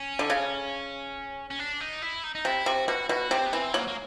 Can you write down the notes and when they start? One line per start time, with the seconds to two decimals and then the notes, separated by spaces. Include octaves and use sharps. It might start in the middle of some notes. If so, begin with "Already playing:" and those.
Already playing: C#4
0.19 D3
0.30 C#3
1.50 C#4
1.59 D4
1.80 D#4
2.02 E4
2.24 D#4
2.35 D#4
2.45 C3 E4
2.66 C3 F#4
2.88 B2 F#4
3.09 B2 F#4
3.31 C3 C4
3.46 B3
3.53 E3 C4
3.74 F#3 A#3
3.88 A#3